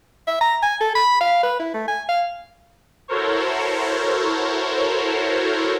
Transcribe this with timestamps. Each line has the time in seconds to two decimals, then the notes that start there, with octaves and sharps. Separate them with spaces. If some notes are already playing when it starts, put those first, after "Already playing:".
0.27 E5
0.41 A#5
0.63 G#5
0.81 A4
0.95 B5
1.21 F5
1.43 B4
1.59 E4
1.74 A3
1.88 G#5
2.09 F5
3.08 E4 F#4 A4 A#4 C5 C#5